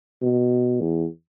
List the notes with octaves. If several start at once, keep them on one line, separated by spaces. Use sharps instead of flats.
B2
E2